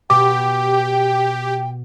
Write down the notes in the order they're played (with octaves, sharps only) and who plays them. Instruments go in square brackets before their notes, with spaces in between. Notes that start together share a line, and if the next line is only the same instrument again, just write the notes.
[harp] B2 [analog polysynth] G4 [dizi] G5 [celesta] D6